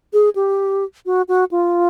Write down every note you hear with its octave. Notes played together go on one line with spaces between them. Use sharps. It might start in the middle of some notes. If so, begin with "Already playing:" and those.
G#4
G4
F#4
F#4
F4